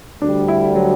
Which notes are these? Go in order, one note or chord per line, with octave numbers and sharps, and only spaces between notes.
D2 D3 G3 D4
E4
F#3